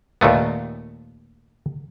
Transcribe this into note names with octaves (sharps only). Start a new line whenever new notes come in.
D#2 A#2 A3 B3